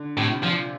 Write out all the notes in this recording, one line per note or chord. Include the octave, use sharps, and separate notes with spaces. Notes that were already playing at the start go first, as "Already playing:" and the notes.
Already playing: D3
A2 C3
A#2 F3